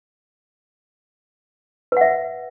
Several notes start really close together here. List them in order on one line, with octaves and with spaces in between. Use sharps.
B4 F#5 E5